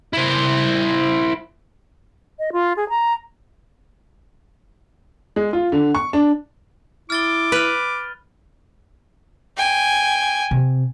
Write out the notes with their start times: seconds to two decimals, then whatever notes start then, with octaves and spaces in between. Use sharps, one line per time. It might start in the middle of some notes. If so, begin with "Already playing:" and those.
0.13 E4 C5
2.39 D#5
2.53 F4
2.77 G#4
2.89 A#5
5.36 G#3
5.53 F4
5.72 D3
5.95 C#6
6.13 D4
7.10 E4 D6 F6 A6 G7
7.52 B4 B5 F6
9.57 G5 G#5
10.51 C3